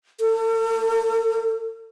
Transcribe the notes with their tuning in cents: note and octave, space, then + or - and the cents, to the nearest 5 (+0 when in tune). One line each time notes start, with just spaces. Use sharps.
A4 +45